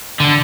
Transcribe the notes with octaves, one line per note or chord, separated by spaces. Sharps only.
D3